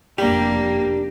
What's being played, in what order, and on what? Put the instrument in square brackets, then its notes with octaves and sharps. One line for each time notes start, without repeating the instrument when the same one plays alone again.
[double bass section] F1 F2 [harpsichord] G3 [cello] A#3 [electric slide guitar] D4 G4